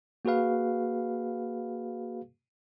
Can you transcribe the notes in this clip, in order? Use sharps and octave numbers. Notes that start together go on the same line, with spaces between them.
A#3 F#4 G#4 B4 F5